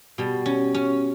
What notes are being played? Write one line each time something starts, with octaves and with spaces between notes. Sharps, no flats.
B2 G3
C#4
C#4